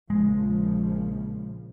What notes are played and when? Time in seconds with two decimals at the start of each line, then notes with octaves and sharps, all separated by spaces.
0.10 A#1 C#3 F3 G#3